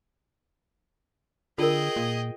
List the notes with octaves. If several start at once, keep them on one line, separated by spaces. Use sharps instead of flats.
D3 F4 G#4 A#4 D#5 G5
A#2